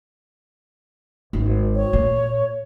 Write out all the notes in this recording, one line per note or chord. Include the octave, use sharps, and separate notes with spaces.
G#1
C#5
A#2